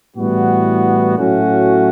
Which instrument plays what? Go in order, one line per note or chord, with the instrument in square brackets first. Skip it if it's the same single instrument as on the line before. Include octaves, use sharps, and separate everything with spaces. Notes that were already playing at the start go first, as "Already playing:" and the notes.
[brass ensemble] A2 E3 G3 B3 F#4
A2 F#3 A3 C#4 F#4